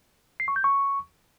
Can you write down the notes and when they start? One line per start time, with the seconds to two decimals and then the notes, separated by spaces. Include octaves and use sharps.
0.40 C7
0.48 C#6
0.56 G6
0.64 C#6